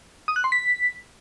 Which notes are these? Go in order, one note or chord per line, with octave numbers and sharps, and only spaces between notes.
D#6
F#6
C6
B6